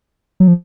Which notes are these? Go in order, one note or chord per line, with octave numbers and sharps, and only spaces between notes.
F#3
F3